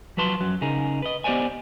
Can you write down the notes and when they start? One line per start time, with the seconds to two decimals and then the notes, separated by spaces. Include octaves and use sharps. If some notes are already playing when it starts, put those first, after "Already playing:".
0.17 F3 F#3 B4 A5 C6
0.41 F#2 F#3
0.61 C#3 D#4 G#4 A#4
1.02 B4 D#5
1.24 B3 G4 C5 D5 D#5 G#5